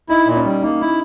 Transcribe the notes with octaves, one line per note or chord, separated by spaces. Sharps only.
D#4 E4
A#2
C#4
G3
A#3 D#4
E4